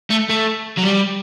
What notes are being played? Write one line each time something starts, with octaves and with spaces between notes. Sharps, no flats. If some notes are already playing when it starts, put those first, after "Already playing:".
A3
A3
F#3
G3